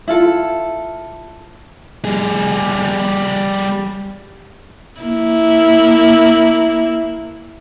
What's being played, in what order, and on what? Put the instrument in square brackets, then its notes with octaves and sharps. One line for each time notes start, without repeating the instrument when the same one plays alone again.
[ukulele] E4 F4 A4
[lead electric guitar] G3 G#4
[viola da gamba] A#3 E4